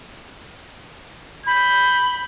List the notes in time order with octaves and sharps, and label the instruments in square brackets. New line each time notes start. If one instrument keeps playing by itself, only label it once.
[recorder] B5 [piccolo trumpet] G6